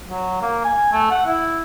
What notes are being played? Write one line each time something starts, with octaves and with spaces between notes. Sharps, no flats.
F#3
A#3
G#5
A3
F#5
E4